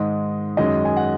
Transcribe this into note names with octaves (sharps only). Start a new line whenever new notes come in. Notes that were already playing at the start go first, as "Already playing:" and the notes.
Already playing: G#2 D#3 G#3 D#5
F#2 D#3 G#3 D#5
G#5
F#5